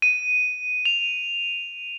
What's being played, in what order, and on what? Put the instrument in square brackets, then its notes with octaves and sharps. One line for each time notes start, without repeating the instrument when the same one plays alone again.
[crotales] D#7
F7